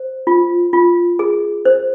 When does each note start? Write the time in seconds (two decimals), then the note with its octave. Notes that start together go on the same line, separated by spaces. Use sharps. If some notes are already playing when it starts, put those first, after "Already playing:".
Already playing: C5
0.27 F4
0.73 F4
1.19 G#4
1.65 C5